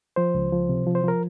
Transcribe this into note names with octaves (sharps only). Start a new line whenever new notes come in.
F3 C5
C#2
F3
C3
F3
C5
F3 A#4